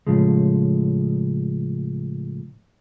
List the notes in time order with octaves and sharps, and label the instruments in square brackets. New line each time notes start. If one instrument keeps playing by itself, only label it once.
[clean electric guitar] A2 C#3 F3 G#3